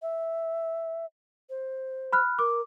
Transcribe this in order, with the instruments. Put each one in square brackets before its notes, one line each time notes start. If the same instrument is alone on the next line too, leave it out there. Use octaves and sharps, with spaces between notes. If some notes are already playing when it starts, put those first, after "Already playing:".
[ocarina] E5
C5
[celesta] B5 F6 F#6
[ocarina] A#4 [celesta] D6